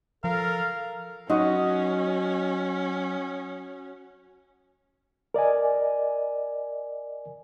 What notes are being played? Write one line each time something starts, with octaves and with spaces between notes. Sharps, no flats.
F3 A4 A#4 F5
F#3 C#4 D#4 F#4 D#5
A#4 D5 D#5 G#5